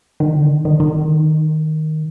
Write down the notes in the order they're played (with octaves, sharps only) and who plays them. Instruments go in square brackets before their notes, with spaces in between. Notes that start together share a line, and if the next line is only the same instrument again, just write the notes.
[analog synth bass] D#3
D3
D#3
D#3